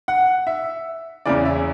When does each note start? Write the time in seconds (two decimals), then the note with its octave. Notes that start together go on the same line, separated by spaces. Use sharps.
0.08 F#5
0.47 E5
1.26 E2 C#3 E3 D5
1.45 E5